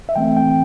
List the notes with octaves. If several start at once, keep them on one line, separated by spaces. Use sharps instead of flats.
E5
E3 A3 C4 G5
G5